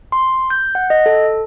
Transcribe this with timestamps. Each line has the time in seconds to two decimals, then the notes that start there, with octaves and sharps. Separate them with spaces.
0.12 C6
0.50 G6
0.75 F#5
0.90 D#5
1.06 A4